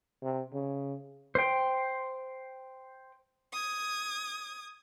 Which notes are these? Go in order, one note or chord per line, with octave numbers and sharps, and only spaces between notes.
C3
C#3
C5 G5
D#6 G#6